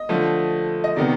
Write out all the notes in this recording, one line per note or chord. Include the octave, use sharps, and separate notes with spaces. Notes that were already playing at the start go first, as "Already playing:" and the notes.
Already playing: D#5
D3 F3 A3
D#5
C3 D#3 G3 B3 D5